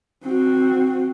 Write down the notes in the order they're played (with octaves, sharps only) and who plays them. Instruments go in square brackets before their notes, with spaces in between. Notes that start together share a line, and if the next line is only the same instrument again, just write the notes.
[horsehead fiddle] C4 F#4